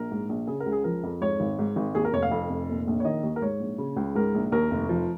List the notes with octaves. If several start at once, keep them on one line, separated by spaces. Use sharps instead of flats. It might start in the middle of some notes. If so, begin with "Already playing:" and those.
Already playing: A#1 A#4
G#2
A#1
C#3 G#4
A#4
C#2
G#4
F3 A#4
F2
G#2 C#5
G#1
G#2
G#1
D#2 G#4
A#4
F1 C#5
F5
F2
F1
A#2
A#1
C#5
D#3 D#5
D#2
A#4
G#2 C#5
A#1
C#3
C#2
G#2 A#4
A#1
D#2 A#4
F1
F3